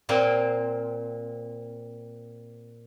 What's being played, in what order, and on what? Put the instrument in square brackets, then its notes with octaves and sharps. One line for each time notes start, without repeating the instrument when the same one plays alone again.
[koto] A#2 A#3 C4